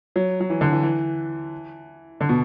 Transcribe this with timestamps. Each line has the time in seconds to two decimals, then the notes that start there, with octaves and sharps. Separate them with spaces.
0.16 F#3
0.40 F#3
0.50 E3
0.61 D3
0.73 E3
0.83 E3
2.21 D3
2.29 B2